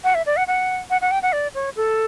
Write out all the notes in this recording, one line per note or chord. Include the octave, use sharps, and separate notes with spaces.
F#5
E5
D5
F#5
F#5
F#5
F#5
G5
F#5
D5
C#5
A4